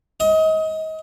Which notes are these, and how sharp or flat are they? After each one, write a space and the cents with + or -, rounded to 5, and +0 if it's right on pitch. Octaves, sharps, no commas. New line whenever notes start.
D#5 +30